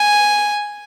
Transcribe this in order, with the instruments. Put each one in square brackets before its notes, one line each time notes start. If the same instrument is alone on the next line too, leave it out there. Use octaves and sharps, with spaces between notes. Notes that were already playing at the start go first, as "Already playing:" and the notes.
Already playing: [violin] G#5